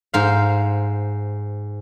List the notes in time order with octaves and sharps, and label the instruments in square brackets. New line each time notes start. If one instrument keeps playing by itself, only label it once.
[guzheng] G#2 C5 F5